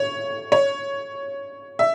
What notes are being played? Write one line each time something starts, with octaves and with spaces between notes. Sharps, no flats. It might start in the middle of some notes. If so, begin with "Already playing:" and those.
Already playing: C#5
C#5
E5